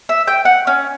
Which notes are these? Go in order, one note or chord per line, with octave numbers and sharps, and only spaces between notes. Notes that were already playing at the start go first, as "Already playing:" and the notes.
E5
G5
F#5
C#4